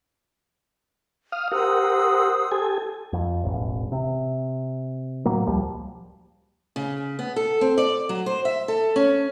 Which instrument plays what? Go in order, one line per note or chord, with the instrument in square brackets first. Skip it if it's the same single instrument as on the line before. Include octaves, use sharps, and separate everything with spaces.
[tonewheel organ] F5 D#6 F6
[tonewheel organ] G4 A#4 F#5 [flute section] C5 D#6 E6
[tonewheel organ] G4 A4 G#5
[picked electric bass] F2
E1 A1
C3
A2 F#3 A#3
E1 C#2 F3 G3
[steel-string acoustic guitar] C#3
B3
A4
C4
D5
F#3
C5
E5
A4
C#4